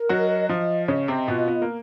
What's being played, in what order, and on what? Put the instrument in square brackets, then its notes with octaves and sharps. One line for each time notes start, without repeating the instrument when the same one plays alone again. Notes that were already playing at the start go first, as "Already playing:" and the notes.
Already playing: [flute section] A#4
[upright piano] F#3 F#4 [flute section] D#5
[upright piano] F3 F4 [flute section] D#5
[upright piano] C#3 C#4 [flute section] D#5
[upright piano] C3 C4
[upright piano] B2 B3 [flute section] F4
[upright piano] B3
A#3